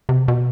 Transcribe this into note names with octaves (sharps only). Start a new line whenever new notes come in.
C3
B2